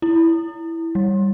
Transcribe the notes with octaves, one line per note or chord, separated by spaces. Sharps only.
E4
G3